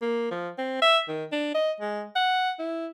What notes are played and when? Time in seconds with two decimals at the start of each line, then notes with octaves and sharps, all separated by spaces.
0.02 A#3
0.31 F3
0.58 C4
0.82 E5
1.08 D#3
1.32 D4
1.54 D#5
1.80 G#3
2.16 F#5
2.59 E4